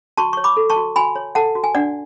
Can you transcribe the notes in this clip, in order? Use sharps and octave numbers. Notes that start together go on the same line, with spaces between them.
F#4 A5 C#6
C#5 C#6
B5 D6
A4
A5 C#6
F#4
F#4 G#5 B5
C#5
A4 F#5 A5
F#4
G#5
D4 D5 F#5